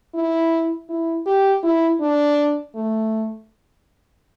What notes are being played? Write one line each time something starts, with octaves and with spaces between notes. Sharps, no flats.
E4
E4
G4
E4
D4
A3